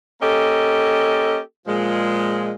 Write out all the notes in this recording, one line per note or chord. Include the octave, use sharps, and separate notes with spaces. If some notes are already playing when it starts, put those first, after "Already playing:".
A#3 C#4 G4 A4 D#5
A#2 F3 G#3